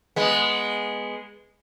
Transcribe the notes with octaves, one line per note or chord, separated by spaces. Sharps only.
G#3 B3